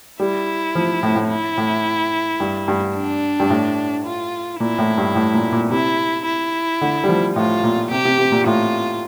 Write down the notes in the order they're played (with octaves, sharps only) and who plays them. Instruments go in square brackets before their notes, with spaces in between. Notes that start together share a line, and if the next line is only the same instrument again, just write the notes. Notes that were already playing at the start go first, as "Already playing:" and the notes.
[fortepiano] G3 [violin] E4
[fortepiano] F3
A2
A2
[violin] E4
[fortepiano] A2
G2
G2
[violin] D4
[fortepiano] G2
A2
[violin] F4
[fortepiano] A#2 [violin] E4
[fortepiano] A2
G2
A2
A#2
A#2
[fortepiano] C3 [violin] E4
[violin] E4
[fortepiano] D3
G3
F3
[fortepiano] A2 [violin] F4
[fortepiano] A#2
[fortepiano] C3 [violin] G4
[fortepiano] C3
C3
A#2
[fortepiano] A2 [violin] F4